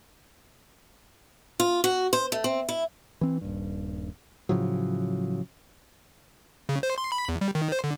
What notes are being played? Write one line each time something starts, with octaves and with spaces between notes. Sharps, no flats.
F4
F#4
C5
A3
C4
E4
E3 C4
D#1 G2
A2 C#3 F3 F#3
C#3
C5
C6
B5
E2
G3
D#3
C5
D3